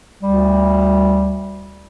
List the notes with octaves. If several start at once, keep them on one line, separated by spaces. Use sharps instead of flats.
D2 G3